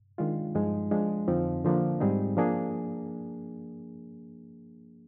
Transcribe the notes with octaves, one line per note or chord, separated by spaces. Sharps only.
D#3 G#3 D4 F4
G2 F3 G#3 D#4
F3 G#3 D4
F2 D3 F3 C4 D#4
D3 F3 A#3 D4
G#2 G3 C4 D#4 G#4
F3 A#3 D4 G#4